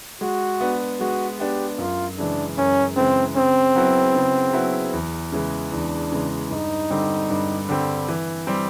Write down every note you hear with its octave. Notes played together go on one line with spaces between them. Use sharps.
G#3 F#4
B3 D4
G#3 F#4
B3 D4 G4
F#2 F4
C#3 E3 G#3 D4
F#2 C#4
C#3 E3 G#3 C4
C#3 C4
F#3 B3 E4
C#3
F#3 B3 E4
E2
C#3 E3 G#3
E2 D4
C#3 E3 G#3
G2 D#4
D3 G3 C4
G2
D3 G3 C4
E3
G3 C4